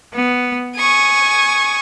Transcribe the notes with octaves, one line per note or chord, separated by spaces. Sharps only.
B3
G#5 C#6 D#6